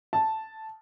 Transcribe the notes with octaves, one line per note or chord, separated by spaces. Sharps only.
A5